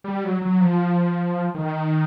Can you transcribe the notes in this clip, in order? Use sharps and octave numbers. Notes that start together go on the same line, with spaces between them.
G3
F#3
F#3
F3
D#3